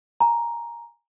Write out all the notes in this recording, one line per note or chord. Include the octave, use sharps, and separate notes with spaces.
G#5 A#5